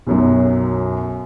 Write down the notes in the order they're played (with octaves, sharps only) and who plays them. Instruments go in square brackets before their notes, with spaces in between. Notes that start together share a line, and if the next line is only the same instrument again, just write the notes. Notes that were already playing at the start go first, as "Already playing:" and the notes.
[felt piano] B1 F#2 F#3